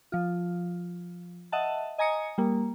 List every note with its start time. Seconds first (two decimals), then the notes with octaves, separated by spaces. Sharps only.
0.12 F3 F4
1.52 D#5 E5 F#5 A5
1.98 D#5 G#5 A#5 D#6 C#7
2.38 G3 A#3